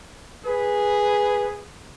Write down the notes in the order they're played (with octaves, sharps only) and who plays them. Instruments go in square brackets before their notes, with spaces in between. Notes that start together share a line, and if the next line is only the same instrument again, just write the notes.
[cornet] G#4 [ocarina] B4